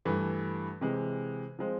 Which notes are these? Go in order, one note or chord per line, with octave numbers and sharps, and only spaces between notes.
G2 E3 A3
C3 E3 G#3
F3 G#3 C4